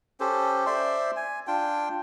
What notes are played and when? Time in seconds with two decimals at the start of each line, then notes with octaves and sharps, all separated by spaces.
0.20 C#4 G4 A4 C5
0.66 C5 D5 E5 C6
1.16 G#5
1.47 D4 F4 G5